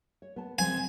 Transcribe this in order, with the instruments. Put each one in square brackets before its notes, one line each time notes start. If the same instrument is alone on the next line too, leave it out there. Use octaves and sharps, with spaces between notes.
[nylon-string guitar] C#5
B3 A5
[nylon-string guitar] F3 G#3 C4 [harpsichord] G#5